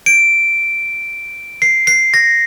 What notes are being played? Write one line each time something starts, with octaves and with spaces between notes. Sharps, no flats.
D7
C7
C7
A#6